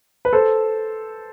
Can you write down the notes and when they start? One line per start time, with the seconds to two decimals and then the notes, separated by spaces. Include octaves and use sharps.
0.25 B4
0.33 A4 C5